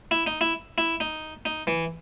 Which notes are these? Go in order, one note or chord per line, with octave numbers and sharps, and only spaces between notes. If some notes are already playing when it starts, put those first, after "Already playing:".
E4
D#4
E4
E4
D#4
D#4
E3